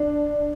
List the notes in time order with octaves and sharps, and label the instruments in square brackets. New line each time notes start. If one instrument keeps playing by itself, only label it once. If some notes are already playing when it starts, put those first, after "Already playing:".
Already playing: [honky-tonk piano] D4